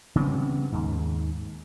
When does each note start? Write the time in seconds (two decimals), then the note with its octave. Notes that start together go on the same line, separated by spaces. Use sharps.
0.15 C#3 G3 B3 C4
0.72 D#2 G#2